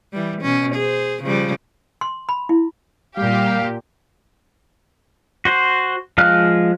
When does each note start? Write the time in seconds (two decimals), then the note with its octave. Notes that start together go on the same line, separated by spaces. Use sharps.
0.13 E3 G3
0.42 B2 C#4
0.75 G#4 C5
1.23 C#3 F3 G3
2.01 C6
2.29 B5
2.49 E4
3.17 A#2 G3 G4 F5
5.45 F#4 C5
6.18 F3 G#3 F5 F6 F#6